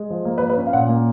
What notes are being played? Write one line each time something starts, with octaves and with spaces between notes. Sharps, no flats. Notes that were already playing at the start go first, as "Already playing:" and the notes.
Already playing: G#3
F3
A#3
B4
F3
B4
C#4
F5
A#2 F#5
A#3